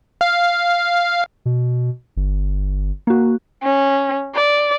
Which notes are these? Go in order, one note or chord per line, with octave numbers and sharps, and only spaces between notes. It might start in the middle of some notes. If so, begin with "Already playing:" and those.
F5
B2
G1
A#3 F#4
C#4
D5